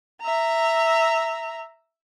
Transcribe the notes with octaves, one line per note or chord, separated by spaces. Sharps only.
E5 A#5